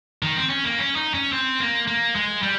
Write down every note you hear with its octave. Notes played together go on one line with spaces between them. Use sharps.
D#3
C4
C#4
A#3
C#4
D#4
C#4
C4
A#3
A#3
G#3
G3